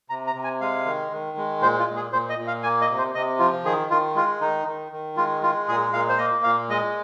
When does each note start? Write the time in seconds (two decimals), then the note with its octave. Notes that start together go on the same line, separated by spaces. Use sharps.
0.10 C3 A#5
0.27 A#5
0.35 C3
0.44 G#5
0.61 G#3 F5
0.86 D#3
1.12 D#3
1.37 G#3
1.62 A#2 C5
1.79 F4
1.88 A#2
1.96 G#4
2.13 A#2 C5
2.29 D#5
2.39 A#2
2.47 F5
2.63 A#3 G#5
2.81 D#5
2.90 C3
2.98 C5
3.15 C3 D#5
3.39 F3 F4
3.65 D#3 G#4
3.90 D#3 F4
4.15 G#3 F4
4.41 D#3 D#4
4.67 D#3
4.92 D#3
5.17 G#3 F4
5.42 G#3 F4
5.68 A#2 G#4
5.93 A#2 F5
6.09 C5
6.18 A#3 D#5
6.44 A#2 F5
6.70 G#3 D#5